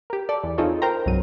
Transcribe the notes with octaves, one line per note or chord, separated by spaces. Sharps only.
G4 A#4
A4 D5
E2
C4 D#4 F4 G#4 A4 C#5
A#4 C5 G5 A#5
C2 G2 F#3 D#7